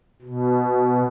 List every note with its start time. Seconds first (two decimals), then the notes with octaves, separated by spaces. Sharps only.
0.22 B2